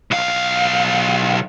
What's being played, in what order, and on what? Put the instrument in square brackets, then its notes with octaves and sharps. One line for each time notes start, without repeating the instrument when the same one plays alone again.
[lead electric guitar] B1 F5